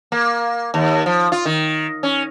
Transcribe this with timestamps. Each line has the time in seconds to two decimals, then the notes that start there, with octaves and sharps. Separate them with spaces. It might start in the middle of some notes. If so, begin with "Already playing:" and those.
0.12 A#3
0.74 D#2
1.06 F3
1.32 F4
1.45 D#3
2.03 C#4